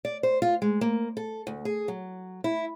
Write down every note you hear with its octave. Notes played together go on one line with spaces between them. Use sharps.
D5
C5
F4
G#3
A#3
A4
D2
G#4
F#3
E4